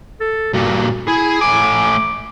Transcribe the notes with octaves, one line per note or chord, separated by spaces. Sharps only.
A4
G2 A#2 F#4
E4 G#4
A2 G#5 D6